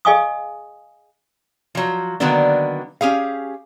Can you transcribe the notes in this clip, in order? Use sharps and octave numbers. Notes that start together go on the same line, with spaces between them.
G#4 D#5 F5 G#5 C#6 D#6
F3 F#3
D3 D#3 F#3 A#3 B3 D4
C#4 G4 G#4 F5